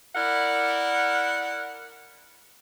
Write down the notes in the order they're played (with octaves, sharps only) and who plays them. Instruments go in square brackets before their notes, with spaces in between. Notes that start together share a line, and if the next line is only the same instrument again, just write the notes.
[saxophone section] E4 A#4 D5 F#5